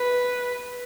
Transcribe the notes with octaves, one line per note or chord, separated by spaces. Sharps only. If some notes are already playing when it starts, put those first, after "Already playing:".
Already playing: B4